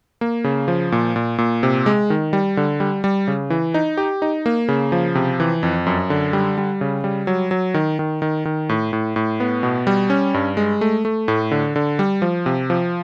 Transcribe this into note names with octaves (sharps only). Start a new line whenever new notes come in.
A#3
C#3
F3
A#2
A#2
A#2
C3
G#3
D#3
G3
D3
G3
G3
C#3
E3
D#4
G4
D#4
A#3
C#3
F3
C3
E3
F2
F#2
D3
G3
G3
C#3
G3
F#3
F#3
D#3
D#3
D#3
D#3
A2
A2
A2
B3
B2
G3
C#4
G2
G#3
A3
A3
A2
D3
D3
G3
F3
C3
F3